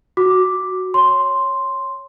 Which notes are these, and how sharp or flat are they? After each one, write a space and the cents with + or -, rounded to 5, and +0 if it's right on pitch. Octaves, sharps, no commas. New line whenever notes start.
F#4 +0 D6 +0
C#5 +0 C6 +0